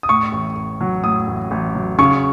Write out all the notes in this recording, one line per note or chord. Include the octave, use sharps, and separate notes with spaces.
D#6
A2 C#6
A1
A1
F#3
A2 D#6
A1
A1
F#3
C#3 C#6